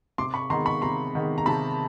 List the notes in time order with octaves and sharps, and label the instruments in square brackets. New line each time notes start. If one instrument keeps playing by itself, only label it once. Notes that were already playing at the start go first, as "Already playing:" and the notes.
[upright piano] C3 C6 D6
B5 C#6
D#3 G#3 B3 A#5 C6
B5 C#6
C3 A#5 C6
D#3 G#3 B3
A#5
C3 A5 B5